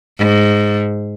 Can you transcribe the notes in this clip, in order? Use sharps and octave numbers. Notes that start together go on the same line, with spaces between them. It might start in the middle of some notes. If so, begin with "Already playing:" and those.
G#2